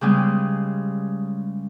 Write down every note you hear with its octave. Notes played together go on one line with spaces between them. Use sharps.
C#3 G3 G#3 B3